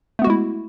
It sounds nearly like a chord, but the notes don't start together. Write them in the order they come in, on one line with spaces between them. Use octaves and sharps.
A3 B3 F#4 G#3 E4